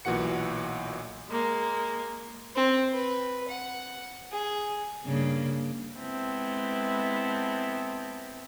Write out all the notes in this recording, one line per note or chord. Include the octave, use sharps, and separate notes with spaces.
B1 A#2 E3 F#4 F#5 C#7
G#3 A#3
C4
B4
F#5
G#4
G2 C#3 A#3
G#3 B3 C4 E4 A4